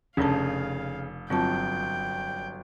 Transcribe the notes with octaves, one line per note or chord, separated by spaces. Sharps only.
F1 C#3 C#4 D4 F5 A5
G1 F#3 C4 F4 G5 A5